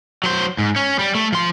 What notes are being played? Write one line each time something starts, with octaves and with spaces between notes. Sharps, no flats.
F#3 C5
G#2
C#4
G3
A3
F3 C6